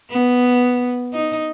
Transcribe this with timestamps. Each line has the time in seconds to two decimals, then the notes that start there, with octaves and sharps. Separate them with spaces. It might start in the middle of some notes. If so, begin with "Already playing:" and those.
0.10 B3
1.13 D#4